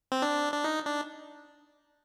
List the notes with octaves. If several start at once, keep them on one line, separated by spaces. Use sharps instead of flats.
C4
D4
D4
D#4
D4